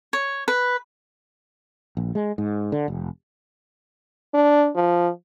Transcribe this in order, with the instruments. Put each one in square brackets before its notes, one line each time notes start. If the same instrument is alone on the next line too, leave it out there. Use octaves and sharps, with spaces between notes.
[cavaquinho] C#5
B4
[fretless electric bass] A#1
G#3
G#2
D3
F1
[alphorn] D4
F3